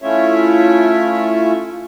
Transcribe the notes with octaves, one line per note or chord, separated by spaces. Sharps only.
A3 C#4 E4 F4 C#5 E5